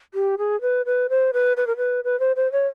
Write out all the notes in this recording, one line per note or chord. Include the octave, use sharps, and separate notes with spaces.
G4
G#4
B4
B4
C5
B4
B4
A#4
B4
B4
C5
C5
C#5